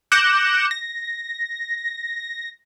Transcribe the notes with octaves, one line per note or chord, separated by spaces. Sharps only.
D6 F#6 G6 A#6 C#7 E7
A#6